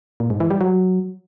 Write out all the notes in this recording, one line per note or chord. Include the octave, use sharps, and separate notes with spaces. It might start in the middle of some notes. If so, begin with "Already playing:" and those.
A#2
G#2
E3
G3
F#3